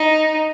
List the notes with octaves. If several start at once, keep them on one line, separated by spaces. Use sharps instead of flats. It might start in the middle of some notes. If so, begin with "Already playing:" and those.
Already playing: D#4